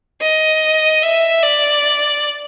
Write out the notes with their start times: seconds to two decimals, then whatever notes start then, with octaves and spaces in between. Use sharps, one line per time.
0.21 D#5
1.03 E5
1.43 D5